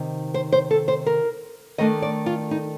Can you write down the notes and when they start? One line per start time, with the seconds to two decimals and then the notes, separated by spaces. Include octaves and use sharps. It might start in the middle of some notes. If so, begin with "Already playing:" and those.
Already playing: C3 D#3 D#4
0.34 C5
0.52 C5
0.71 A4
0.88 C5
1.06 A#4
1.78 D#3 A3 D4 D#5
2.02 D5
2.26 F4
2.51 D#4